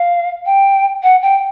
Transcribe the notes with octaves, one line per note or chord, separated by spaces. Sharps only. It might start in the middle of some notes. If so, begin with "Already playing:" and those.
Already playing: F5
G5
F#5
G5